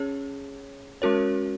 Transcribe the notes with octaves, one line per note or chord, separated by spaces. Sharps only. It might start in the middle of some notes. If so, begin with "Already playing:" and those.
Already playing: C#4 G#4 C#5
G#3 C#4 F#4 A#4 C#5